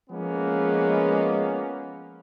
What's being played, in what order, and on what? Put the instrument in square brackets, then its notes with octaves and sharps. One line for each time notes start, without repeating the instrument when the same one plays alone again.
[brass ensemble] F3 G#3 A#3 B3 C#4